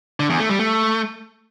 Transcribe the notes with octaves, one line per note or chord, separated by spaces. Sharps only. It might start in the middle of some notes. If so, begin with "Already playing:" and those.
D3
E2
A3
G3
A3